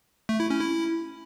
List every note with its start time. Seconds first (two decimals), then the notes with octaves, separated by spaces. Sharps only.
0.29 A3
0.40 E4
0.50 C#4
0.61 E4